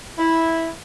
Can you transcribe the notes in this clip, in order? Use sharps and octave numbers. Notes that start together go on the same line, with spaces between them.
E4